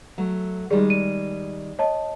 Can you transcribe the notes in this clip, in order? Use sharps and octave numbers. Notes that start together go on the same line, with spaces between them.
F#3 A3
D#3 G3 G#3 G#4 D5
D#7
C#5 D#5 A5